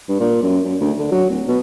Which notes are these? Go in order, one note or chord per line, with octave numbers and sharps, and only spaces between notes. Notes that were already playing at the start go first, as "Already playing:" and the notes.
G2
A#2
F#2
F#2
D2
D3
F#3
D1
B2